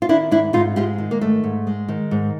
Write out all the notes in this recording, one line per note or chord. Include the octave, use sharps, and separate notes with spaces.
F4
D#3 D4 E4
G#2 D4 E4
G#2 D#4 F4
G#3 F4 G4
D#3
A#3
G#2 A3
G#2
G#3
D#3
G#2